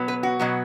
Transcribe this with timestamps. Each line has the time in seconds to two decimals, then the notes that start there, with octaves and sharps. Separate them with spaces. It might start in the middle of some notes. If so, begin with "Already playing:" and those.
Already playing: B2 F#3 B3
0.08 B4
0.23 F#4
0.39 B2 F#3 B3